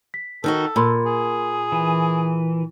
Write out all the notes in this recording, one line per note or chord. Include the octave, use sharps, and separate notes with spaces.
B6
D#3 D#4 F#4 A4
A#2 A#4 B5 C6
G#4
E3